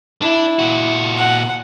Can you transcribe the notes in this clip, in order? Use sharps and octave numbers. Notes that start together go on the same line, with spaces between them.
D4 E4
A#2 F#4
F#5